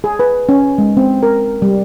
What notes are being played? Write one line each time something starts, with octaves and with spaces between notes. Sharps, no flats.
G#4
B4
C#4
G#3
C4
A#4
G3